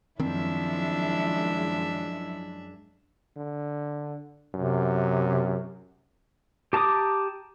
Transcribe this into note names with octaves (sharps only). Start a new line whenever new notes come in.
F#2 D#3 F3 G#3 C4 D4 E4 E5
D3
F#2 C3
G4 A5 A#5 D6 D#6